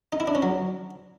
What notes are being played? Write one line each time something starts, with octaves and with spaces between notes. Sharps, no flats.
D#4
E4
D4
C#4
F#3